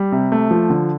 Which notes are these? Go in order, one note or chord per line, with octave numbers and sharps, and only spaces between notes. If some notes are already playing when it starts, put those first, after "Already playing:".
Already playing: G3
C3
A3
F3
D3